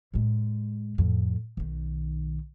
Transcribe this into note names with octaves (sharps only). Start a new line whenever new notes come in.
A2 G#3
F2 A2
B1 D#3